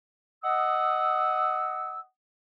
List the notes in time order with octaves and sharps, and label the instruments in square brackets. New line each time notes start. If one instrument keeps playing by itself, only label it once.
[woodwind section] D#5 F#5 D#6 E6